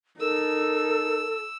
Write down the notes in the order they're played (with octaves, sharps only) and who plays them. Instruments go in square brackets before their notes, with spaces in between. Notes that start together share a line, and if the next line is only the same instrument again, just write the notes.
[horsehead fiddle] D#4 [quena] A4 [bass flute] A#4 [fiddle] E6